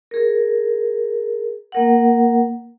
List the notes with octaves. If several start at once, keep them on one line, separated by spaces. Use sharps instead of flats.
G#4 A#4
A#3 A#4 F#5